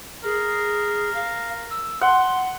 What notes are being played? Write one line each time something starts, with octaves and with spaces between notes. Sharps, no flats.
G#4 A#4
F5
E6
F#5 C6